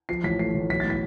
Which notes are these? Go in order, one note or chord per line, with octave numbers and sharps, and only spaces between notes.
F3 C7
A1 B6
A3 C7
A1
B1 B6
A2 A6
B6